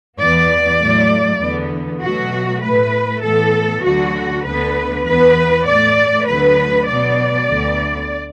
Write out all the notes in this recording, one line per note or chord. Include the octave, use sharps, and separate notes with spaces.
E2 E3 B3 D5
A2 F#3 A3
E2 D3 B3
B2 F#3 A3 F#4
A2 A3 B4
A2 E3 B3 A4
D2 D3 F#3 F#4
D2 D3 B3 B4
E2 E3 B3 B4
A2 A3 D5
D2 D3 F#3 B3 B4
B2 F#3 B3 D5
D2 D3 B3